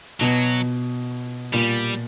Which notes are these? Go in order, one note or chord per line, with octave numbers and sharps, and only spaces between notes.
B2 F#3
A#2 G3